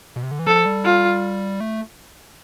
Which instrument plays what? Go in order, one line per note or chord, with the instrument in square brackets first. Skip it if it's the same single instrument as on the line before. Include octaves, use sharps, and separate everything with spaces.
[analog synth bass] B2
C3
D3
E3
[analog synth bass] F3 [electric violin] A4
[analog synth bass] G3
[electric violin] F4
[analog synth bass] A3